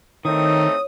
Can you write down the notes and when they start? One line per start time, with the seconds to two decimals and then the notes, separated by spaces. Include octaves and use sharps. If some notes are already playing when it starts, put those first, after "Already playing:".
0.25 D#3 A3 C4 D#4 E4 C#5 D#5 D#6